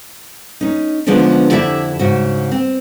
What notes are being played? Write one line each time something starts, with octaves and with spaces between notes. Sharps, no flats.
C#4 D#4
D3 F3 G#3 B3 C#4 D4
F2 D3 E4 G4 D5 E5
G#2 C#3 F#4
C4